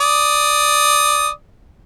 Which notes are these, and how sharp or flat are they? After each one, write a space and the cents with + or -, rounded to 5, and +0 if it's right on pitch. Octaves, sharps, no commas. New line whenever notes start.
D5 +0 D#6 +0